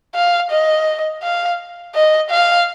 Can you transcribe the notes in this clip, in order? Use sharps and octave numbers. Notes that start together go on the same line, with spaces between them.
F5
D#5
F5
D#5
F5